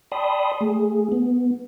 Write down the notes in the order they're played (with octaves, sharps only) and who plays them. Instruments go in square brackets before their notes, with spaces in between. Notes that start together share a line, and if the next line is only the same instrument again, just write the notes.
[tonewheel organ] D5 G5 A5 B5 C6 D#6
A3 G#4
B3